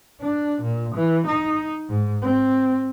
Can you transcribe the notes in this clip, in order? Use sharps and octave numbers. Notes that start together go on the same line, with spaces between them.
D4
A#2
E3
D#4
G#2
C4